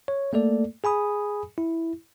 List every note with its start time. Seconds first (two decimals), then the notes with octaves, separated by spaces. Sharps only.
0.08 C#5
0.33 A3 A#3 A4 D5
0.84 G#4 G#5 B5 D#6
1.58 E4